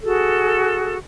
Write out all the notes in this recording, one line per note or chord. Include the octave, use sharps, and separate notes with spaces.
F#4 G#4 A4